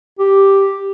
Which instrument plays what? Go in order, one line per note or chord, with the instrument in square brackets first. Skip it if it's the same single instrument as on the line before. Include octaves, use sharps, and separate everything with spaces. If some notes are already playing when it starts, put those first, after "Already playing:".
[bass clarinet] G4